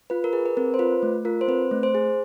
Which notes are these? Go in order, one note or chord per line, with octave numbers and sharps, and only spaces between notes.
F4 B4
A#4
G#4 B4
B4
C4 A#4
C5
F4 B4
A3
F4 A#4
C5
C4 B4
A3
C5
G#4